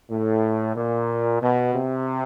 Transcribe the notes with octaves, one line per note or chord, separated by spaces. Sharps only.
A2
A#2
B2
C3